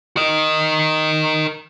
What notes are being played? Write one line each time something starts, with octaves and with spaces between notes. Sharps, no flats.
A#4 D#5